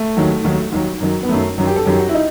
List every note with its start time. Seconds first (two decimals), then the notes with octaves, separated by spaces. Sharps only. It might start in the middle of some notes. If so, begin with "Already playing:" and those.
Already playing: A3
0.17 D#2 D#3 F#3
0.44 D#2 D#3 F#3
0.72 D#2 D#3 F#3
1.00 F#2 D#3 F#3
1.23 B3
1.29 F#2 D#3 F#3 A3
1.58 F#2 D#3 F#3
1.67 G4
1.76 A4
1.86 F#2 D#3 F#3 G4
1.99 F#4
2.09 E4
2.14 D#4